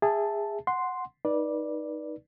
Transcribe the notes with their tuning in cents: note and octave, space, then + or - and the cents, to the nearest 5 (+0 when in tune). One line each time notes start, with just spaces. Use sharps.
G#4 -20 E5 +0 A5 +0
F#5 -10 C6 +0
D#4 +0 B4 -30 D5 +0